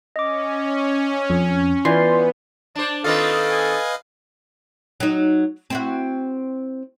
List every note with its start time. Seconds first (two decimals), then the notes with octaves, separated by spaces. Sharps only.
0.16 C#4 D#5 D6
1.30 F2
1.85 E3 B3 F4 D5 C6 G6
2.76 D4 C5 D5
3.04 D#3 C4 F4 A4 B4 D#5 F5
3.51 G#5
5.00 F#3 D#4
5.70 C4 E4 F#4